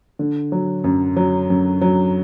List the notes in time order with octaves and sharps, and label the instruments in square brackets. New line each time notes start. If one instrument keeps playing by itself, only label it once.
[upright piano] D3
F#3
F#2
F#3
F#2
F#3